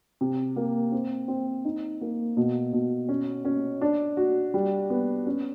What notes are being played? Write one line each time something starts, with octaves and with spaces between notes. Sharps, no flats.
C3
A#3
C4
C4
D#4
A#3
B2
B2
C#4
C#4
D4
F#4
G3
B3
C#4